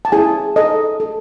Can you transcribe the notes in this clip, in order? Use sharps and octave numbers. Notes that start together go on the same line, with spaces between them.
A5
E4 G#4 G#5
A4 D#5
A4